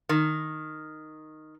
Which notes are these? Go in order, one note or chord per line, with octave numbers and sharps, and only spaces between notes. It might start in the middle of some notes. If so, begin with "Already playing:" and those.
D#3